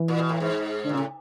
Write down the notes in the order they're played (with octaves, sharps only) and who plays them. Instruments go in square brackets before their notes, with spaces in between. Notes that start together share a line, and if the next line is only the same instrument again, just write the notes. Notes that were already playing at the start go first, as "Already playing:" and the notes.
Already playing: [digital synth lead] E3
[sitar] A#2
B2
A2
G#2
[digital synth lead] D3
[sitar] A#2
[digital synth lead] C#3
[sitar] A2